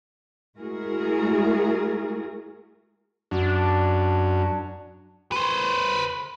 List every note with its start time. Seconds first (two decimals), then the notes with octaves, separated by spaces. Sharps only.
0.57 G#3 A3 E4 F#4 G#4 A#4
3.31 F#2 D4
5.32 B4 C5